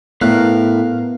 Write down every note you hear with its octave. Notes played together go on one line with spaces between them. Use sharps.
A2 B3 A#4 F5 F#6